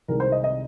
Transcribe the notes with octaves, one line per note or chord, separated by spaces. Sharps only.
C2 C3 D#3 G#3 A#4
C5
D#5
D#5